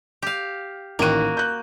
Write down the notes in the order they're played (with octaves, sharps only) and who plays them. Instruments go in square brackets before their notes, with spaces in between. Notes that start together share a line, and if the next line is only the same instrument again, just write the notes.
[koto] G4 F5
[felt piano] A1 D#3 D#7 [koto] A#3 F#4
[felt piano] F#6 G6